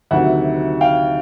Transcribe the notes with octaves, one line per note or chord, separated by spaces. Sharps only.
D2 C3 D#3 F#3 E5 F#5
F5 G5